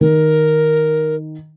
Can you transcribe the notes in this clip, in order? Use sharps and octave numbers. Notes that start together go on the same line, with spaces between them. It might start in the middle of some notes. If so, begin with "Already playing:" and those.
D#3 A#4